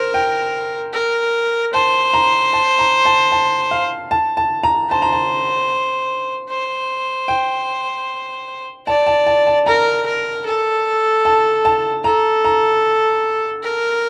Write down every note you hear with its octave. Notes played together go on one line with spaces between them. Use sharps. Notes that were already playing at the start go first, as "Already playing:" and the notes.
Already playing: A#4 C5
G5
A#4
C5 A5
A#5
A5
A#5
A5
A5
F5
A5
A5
A#5
C5 A5
A#5
A5
C5
G5
D5 A5
A5
A5
A5
A#4 A#5
A#4
A4
A5
A5
A4 A#5
A#5
A#4